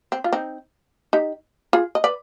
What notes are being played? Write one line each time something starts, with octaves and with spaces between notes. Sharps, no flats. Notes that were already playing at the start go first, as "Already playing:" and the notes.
C4
F4
C4 D#4
D#4 G4
F4 G#4
D#5
B4 D5